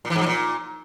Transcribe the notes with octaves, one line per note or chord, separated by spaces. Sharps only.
A#2
E3
G#2
F3
A#2